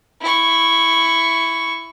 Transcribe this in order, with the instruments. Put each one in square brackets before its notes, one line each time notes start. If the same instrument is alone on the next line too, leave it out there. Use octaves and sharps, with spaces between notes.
[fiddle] E4 C#6